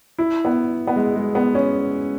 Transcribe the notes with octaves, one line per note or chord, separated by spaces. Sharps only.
E4
B3
B3
G#3
G#3
B3
C#4